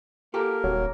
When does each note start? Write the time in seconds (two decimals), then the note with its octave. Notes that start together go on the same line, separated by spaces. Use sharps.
0.34 A#3 G4 A4 A#4
0.64 D#1 F#3